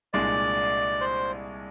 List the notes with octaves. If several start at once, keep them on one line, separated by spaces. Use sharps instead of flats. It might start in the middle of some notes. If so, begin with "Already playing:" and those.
C2 A#2 G#3 D4 D5
C5